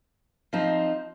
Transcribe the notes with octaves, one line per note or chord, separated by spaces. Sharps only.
F3 C4 D#4